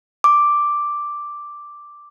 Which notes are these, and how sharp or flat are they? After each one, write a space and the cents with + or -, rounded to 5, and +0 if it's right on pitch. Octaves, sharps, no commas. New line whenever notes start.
D6 +0